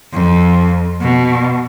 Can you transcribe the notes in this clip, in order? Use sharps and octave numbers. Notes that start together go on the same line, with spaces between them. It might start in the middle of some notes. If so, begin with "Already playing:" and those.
F2
B2